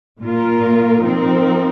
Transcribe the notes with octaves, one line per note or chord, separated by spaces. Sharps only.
A#2 A#3 F4 A#4
F3 C4 D#4 A#4